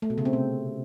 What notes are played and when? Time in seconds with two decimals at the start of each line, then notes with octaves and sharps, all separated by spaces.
0.02 A3
0.10 B2
0.18 C#3
0.25 C4
0.33 C3